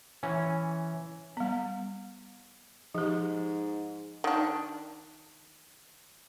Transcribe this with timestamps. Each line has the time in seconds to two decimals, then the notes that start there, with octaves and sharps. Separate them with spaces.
0.23 E3 C#4
1.37 G3 B3
2.95 G#2 F3 G4
4.24 D#3 D4